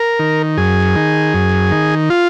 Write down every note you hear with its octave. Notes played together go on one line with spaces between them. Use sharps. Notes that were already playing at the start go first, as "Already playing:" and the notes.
Already playing: A#4
D#3
F#2 G#4
D#3
F#2
D#3
F4